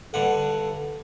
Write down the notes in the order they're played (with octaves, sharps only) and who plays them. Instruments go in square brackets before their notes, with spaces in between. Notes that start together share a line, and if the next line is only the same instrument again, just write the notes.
[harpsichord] G2 D3 F#5 [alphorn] A4